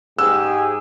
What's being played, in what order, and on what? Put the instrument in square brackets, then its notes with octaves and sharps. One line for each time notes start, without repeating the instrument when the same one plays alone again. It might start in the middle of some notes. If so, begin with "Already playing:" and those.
[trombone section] G#2 G4 G#4 [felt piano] E6